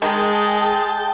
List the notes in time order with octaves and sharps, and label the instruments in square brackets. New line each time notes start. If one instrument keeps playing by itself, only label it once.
[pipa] D#3 [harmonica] G#3 [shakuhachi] G#4 [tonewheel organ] G5 A5